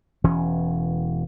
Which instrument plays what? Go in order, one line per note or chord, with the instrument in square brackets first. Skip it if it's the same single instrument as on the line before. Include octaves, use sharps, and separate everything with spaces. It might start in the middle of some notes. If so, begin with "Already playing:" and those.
[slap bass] E1 E3 C#4